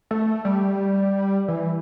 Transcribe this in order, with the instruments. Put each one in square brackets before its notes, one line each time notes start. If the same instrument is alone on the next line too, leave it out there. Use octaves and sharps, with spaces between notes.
[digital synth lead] A3
G3
E3